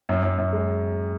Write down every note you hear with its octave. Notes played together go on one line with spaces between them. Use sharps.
F#2
F#2
F#2
G#3